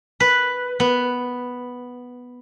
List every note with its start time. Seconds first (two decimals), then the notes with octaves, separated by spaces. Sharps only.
0.20 B4
0.80 B3